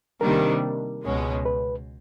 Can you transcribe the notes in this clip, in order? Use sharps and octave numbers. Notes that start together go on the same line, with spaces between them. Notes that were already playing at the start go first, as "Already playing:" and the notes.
C3 D#3 G3 A#3 D4 A#4
C#2 B2 G#3 C#4
B4